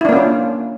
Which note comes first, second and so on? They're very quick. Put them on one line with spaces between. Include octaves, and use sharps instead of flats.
E4 D4 A#3 C#4 F4